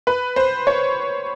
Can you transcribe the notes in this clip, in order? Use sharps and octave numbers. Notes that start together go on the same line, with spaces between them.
B4
C5
C#5